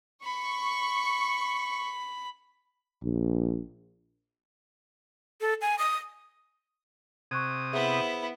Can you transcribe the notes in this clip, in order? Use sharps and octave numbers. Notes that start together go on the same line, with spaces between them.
B5 C#6
A#1
A4
G#5
D#6
C3 C#6 D#6 F#6 G#6
B3 E4 G#4 C5 E5